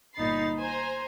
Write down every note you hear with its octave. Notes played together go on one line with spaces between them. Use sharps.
G1 A#2 D#4 B5 A6 C7
C5 G#5 A#5 C6